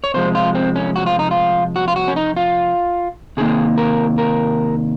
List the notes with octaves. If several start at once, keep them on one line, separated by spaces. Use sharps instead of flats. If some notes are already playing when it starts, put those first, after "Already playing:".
C#5
C3 F3 G#3 C5
F4
C4
C#4
F#4
F4
D#4
F4
F#4
F4
F#4
C#4
D#4
F4
C3 D#3 A#3 G#4
A#4
A#4